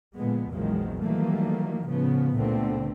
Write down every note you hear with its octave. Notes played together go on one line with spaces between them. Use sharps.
A#2 D3 F3 G#3 B3
A#1 E2 D#3 F3 F#3 G#3
D#3 E3 F#3 G3 A3 A#3
A2 C#3 F3 B3
C#2 A#2 D3 A3 B3 C4